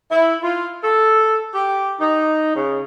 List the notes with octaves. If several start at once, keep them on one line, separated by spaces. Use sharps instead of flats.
E4
F4
A4
G4
D#4
C#3